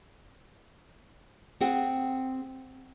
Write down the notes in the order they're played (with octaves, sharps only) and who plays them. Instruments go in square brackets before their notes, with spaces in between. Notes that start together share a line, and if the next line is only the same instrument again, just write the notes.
[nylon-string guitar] C4 G#4 F#5 G5